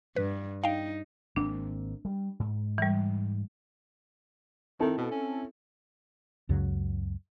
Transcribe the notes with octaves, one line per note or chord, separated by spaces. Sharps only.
G2 B4
D#4 F5 G5
G#1 A#3 C4 D4
G3
G#2
E3 G3
D#3 C4 E4 A4
B2
C#4
C#2 F#2 C#3 F#3